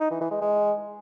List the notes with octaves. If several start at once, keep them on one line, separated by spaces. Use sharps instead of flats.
D#4
E3
E3
G#3
G#3